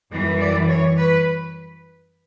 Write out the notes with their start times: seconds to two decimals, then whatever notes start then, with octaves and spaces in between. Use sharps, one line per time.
0.10 F#2 E3 G3
0.39 D5
0.69 C#5
0.97 B4